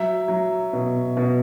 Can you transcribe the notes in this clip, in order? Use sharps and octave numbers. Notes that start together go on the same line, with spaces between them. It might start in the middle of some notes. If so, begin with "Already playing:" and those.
Already playing: F#3 E5
F#3
B2
B2